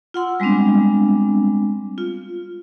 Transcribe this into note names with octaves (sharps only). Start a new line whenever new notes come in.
F4 F#5 C6 E6
G3 G#3 B3 C4 D4
F4